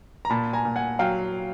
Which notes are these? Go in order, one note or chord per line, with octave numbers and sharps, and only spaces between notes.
A#5
A#2 A5 B5
G#5 A#5
A#2
F#5 G#5
F#3 F5 G5